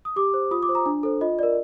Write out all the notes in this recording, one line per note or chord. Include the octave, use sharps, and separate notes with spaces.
D#6
G4 D6
C5
F4 D#6
D6
C5
A#5
D4
A4 C5
F4 D#5
A#4 D5